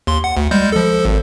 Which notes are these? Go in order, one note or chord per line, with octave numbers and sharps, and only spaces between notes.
D#2 C6
F#5
D2
G3 G#3 G6
F3 A4
G#1